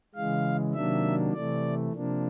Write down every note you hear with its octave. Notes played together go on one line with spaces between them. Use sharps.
C#3 E3 G#3 F5
C3 D#3 F#3 A#3 D4 E5
C3 E3 A3 D5
C3 F3 A#3 D4